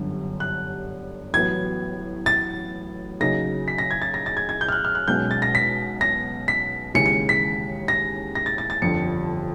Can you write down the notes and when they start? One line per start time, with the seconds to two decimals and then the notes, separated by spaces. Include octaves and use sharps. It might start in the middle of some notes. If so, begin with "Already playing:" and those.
Already playing: G1 F#2 D3 G3
0.40 F#6
1.33 A1 A2 F#3 B3 G#6
2.26 A6
3.20 C#3 F#3 A#3 D#4 A#6
3.68 B6
3.78 A#6
3.91 G#6
4.02 A6
4.14 A#6
4.26 A6
4.37 G#6
4.49 G#6
4.61 G6
4.69 F6
4.72 F#6
4.85 F6
4.95 F#6
5.07 B1 B2 G#3 C#4 G6
5.31 A6
5.42 A#6
5.55 B6
6.01 A#6
6.48 B6
6.94 D#2 C#3 E3 G#3 C#4 C#7
7.06 C#7
7.29 B6
7.88 A#6
8.35 A#6
8.46 A6
8.58 A6
8.70 A6
8.81 G1 F2 D3 F3 C#7